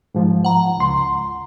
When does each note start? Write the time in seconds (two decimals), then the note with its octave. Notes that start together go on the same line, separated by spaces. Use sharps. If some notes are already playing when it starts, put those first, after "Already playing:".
0.15 G#2 F3
0.45 F#5 A#5
0.77 C#2 C6